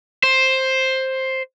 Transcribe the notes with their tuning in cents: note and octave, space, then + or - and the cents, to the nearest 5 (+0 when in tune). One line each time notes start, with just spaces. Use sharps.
C5 +10